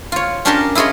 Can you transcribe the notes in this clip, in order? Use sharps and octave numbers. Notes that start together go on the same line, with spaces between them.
F4 C#5
C#4 D4 G4 A#4 A5 C6
E4 F4 G#4 C#5 D#5